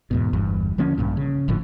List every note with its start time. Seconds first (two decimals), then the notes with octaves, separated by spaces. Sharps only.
0.11 E2 G#2 B2
0.33 G1 E2 G2
0.78 D3 F3 A#3 C#4
0.98 A#1 G2 A#2
1.17 C#3
1.48 G1 A2 D3 F3